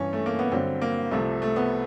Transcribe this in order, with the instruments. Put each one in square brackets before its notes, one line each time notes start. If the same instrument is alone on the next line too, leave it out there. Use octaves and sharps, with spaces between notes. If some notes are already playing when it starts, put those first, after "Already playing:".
Already playing: [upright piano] G2 E3 C#4
A3
A#3
B3
G2 D3 F#3 C4
A#3
C2 C3 F3 A3
A3
B3